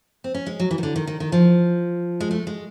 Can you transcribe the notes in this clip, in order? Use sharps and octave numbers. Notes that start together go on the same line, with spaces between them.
C4
C#4
G#3
F#3
E3
D#3
D3
D#3
D#3
D#3
F3
G#3
A3
G#3